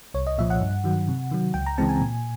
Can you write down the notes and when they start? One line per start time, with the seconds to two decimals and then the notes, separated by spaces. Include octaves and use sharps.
0.14 C2 C#5
0.27 D#5
0.38 A#2 F3 E5
0.50 F#5
0.61 G2
0.84 D#3 F#3
1.08 C3
1.31 D#3 F#3
1.54 C#2 G5
1.66 A#5
1.78 C#3 E3 G#3 C4 A5
1.89 G#5
2.00 A#2